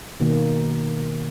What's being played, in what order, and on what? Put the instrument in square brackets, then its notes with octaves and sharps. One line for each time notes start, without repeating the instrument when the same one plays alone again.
[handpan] B2 D#3 A#3